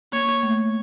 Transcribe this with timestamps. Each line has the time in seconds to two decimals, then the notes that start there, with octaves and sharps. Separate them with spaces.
0.13 A#3 C#5
0.43 A3